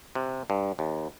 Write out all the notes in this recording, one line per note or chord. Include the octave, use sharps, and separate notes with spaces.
C3
G2
D#2